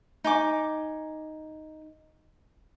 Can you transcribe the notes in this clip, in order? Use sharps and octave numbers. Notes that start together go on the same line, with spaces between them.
D#4 G#5 D6